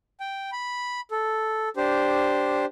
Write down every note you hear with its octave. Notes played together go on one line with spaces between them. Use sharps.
G5
B5
A4
D4 G4 C5